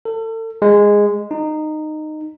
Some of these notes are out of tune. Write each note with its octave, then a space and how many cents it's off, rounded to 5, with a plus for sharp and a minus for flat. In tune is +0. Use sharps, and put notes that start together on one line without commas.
A4 +35
G#3 -10
D#4 -15